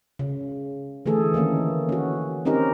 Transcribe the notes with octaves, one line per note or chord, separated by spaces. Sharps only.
C#3
D3 E3 A3 G#4 A4
D#3 E3 A#3 C#4
C#4 F#4
C4 C#4 D#4 G4 A#4